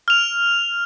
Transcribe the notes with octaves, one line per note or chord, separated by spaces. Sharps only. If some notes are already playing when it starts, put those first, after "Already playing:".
F6 F7